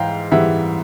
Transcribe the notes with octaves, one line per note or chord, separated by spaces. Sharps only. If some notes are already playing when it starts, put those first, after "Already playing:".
Already playing: G#2 E3 F5 G5
G#2 E3 G3 E5 F#5